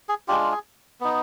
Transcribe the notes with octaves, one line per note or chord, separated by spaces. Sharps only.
G#4
G#3 D4 F4 G4
G#4
B3 D#4